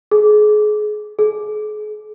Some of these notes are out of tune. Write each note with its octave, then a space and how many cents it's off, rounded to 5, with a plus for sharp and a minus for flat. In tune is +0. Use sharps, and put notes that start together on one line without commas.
G#4 +30
G#4 +40